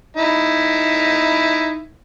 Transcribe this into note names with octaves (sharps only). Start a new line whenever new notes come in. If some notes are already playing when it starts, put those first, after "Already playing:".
D#4 E4